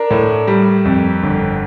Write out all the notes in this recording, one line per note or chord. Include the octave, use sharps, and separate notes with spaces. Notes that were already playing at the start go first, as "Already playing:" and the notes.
Already playing: D4 A#4
A2
G3
F2
G1